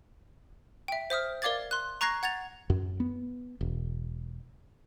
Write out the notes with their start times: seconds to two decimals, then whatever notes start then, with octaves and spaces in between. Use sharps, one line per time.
0.88 E5 G5
1.10 C5 E5 D#6 F6
1.42 A#4 D5 F5 D6 G#6 A6
1.71 C6 F#6
2.01 A#5 C#6 F#6 G#6 A#6 C7
2.23 F#5 G#6 A6 F7
2.70 F#2
3.00 B3
3.61 E1